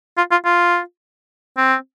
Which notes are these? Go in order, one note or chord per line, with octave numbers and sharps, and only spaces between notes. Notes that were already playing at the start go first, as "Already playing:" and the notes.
F4
F4
F4
C4